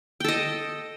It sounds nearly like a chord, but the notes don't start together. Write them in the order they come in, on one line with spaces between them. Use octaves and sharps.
G5 A4 D#5